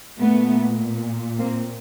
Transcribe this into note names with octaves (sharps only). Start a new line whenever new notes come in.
A#2 A3 B3
A#3 C4